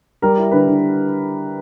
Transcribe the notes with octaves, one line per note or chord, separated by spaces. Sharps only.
G3 A#4
E4
D3 B4
D3